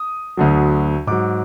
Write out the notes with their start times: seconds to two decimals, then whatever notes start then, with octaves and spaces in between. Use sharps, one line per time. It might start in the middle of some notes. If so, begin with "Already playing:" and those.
Already playing: D#6
0.37 D2 D3 F#3
1.07 G#2 F#3 D6